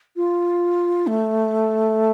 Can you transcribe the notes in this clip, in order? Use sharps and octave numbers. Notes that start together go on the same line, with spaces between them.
F4
A3